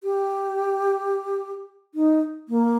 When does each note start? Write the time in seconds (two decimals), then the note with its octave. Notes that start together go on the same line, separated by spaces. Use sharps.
0.04 G4
1.95 D#4
2.49 A#3